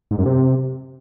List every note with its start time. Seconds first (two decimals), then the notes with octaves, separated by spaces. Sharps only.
0.11 G#2
0.18 F#2
0.26 C3